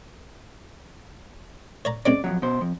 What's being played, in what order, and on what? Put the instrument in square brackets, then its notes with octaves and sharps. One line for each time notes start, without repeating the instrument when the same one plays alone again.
[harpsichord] C#5 D5 A#5
[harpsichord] G#3 C4 C#4 [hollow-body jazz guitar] D5
[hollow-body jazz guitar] F2 G#2 F#3
B2 C5
F2